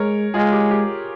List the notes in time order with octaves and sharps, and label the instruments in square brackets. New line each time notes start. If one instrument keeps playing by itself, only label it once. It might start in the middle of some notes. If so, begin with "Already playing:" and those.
Already playing: [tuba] G#3 [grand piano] A#4 C#5
[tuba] G#3 [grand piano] F4 G#4
[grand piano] G4
G4